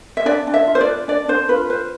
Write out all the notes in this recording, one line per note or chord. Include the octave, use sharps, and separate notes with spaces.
E5
D4 D5
D4
E5
F4
C5
D5
B4
D4 D5
D4 C5
F4 B4
B4 C5